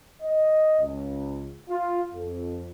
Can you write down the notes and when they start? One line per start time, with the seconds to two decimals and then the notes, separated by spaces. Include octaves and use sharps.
0.22 D#5
0.80 C#2
1.69 F4
2.14 F2